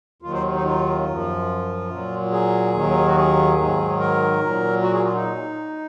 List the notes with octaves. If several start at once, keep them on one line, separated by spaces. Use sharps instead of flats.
D#2 D#3 F#3 F4
C5
D#4
F4
F#2 F3
A#2 F#3
G#4
D#2 D#3 F#3
F#4
G#4
G#2 D#3 F#3
A#4
A#2 F#3
F#4
G#4
F4
D#4